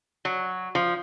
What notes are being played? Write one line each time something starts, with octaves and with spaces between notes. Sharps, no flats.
F#3
F3